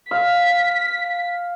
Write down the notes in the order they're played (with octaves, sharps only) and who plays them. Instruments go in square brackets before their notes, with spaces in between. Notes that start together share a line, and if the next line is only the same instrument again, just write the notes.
[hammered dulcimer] F5 [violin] B6